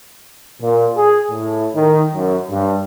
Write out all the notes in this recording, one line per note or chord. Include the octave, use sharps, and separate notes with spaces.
A#2
G#4
A2
D#3
F#2
G2